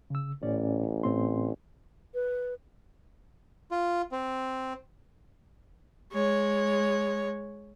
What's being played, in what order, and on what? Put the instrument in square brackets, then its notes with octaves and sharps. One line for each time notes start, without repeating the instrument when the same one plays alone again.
[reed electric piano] C#3 E6
[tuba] A1 [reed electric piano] A2 C#4 D5
[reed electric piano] A2 C4 C6
[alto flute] B4
[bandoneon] F4
C4
[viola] G#3 C#5